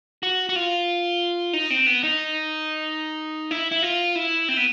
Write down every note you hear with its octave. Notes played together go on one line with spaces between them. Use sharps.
F#4
F#4
F4
D#4
C4
B3
D#4
E4
E4
F4
E4
C4
B3